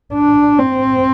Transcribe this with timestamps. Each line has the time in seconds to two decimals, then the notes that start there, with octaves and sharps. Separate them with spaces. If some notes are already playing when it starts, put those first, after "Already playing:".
0.13 D4
0.59 C4